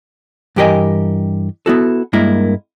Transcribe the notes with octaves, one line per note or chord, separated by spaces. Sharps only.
G2 E3 G4 A#4 D#5 G#5
B3 E4 F#4 A4
G2 G#3 A#3 E4 A#4